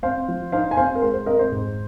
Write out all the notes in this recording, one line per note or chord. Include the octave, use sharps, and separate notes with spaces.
C4 C5 F5
F3
D#4 C5 F5
G#5
C4 C5 F5
A#4
G#3 C5
C5
C4 A#4 D#5
C5
G#2